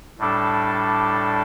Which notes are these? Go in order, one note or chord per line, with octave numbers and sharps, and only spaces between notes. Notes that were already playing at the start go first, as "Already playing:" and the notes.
A2 G3 D4 A4